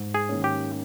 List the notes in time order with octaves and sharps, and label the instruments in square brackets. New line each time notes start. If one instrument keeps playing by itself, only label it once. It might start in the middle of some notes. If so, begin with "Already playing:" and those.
Already playing: [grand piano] G#2
[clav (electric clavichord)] G#4
[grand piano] D#3 A#3 C#4
[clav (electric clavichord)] G4